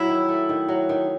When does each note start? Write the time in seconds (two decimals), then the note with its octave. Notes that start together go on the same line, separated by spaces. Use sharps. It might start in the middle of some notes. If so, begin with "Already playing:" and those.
Already playing: F#3 E4
0.08 D#3
0.29 A3
0.49 D#3
0.68 F#3
0.89 D#3